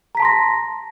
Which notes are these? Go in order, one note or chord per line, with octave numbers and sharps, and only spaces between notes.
A5 A#5 C6 A#6 B6